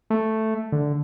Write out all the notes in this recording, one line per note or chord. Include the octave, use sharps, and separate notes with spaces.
A3
D3